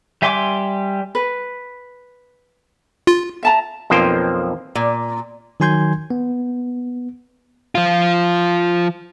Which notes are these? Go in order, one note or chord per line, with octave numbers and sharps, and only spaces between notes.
G3 E5 G#5 C6 D6
B4
F4
E5 A5 A#5
B1 F2 F3 A#3 C5 G5
A#2
D#3 F#3 G#5 C6 G6 G#6
B3
F3 F4